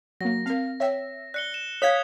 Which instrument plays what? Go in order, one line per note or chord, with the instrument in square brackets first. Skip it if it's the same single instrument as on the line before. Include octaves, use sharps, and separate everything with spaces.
[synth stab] F#3 A#3 [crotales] A#6
[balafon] C4 A#4 [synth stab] F5
[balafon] C#5 G5 [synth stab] E5
[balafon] D5 [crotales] F#6 C#7 G7
[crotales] E7
[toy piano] C#5 F5 [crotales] D#6 G#6 [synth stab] B6